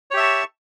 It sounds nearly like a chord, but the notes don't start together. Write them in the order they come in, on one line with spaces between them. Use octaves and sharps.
C#5 G4 E5 A5 C#6